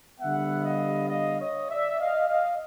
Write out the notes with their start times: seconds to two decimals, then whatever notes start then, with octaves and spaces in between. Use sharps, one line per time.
0.20 D3 G3 B3 E5 F#5
0.65 D#5 F5
1.10 D#5 F5
1.39 C#5 D#5
1.69 D5 E5
2.00 D#5 F5
2.29 D#5 F5